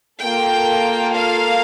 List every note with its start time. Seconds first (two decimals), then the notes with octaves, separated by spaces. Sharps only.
0.21 A#3 F4 A4 G5
1.14 F5